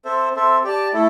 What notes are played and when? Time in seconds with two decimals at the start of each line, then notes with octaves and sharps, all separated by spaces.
0.05 C4 A4 C5 E5
0.35 C4 A4 E5
0.64 G4 D5 A5
0.94 A3 E4 A4